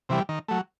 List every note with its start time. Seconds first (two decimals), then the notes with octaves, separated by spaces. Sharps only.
0.09 C3 E3 G3
0.29 D#3
0.48 F#3 A3